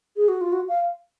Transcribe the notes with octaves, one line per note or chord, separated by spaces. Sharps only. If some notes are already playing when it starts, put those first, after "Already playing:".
G#4
F#4
F4
F#4
F5